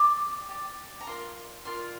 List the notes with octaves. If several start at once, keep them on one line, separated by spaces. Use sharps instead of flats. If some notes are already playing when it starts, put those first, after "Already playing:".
Already playing: G4 D5 D6
G4 D5
A#5
F4 A#4 D5 C6
F4 A#4 D5 C6